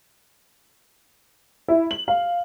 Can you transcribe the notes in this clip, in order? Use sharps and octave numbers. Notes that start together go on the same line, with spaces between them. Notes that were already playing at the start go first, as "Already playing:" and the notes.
E4
F#7
F5